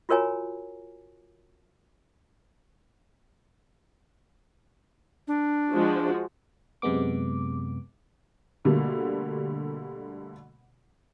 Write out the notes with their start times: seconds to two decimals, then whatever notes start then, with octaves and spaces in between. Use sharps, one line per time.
0.09 F4 F#4 A#4 C#5 G#5 A#5
5.28 D4
5.73 F3 G#3 F#4
6.82 F#2 C3 G#3 B3 D6
8.65 B2 D3 G3 A3 A#3